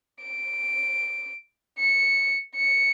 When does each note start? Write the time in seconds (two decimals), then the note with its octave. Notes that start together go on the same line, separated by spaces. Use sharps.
0.22 D7
1.79 C#7
2.56 C#7